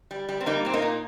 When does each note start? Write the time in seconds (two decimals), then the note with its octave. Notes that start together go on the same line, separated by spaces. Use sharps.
0.11 G3
0.29 G3
0.41 C4
0.46 G3 A#3 D#4
0.65 A#2 C4
0.73 A#3 D#4
0.82 A#2